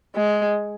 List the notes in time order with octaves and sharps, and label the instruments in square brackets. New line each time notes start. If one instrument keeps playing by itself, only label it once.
[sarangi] G#3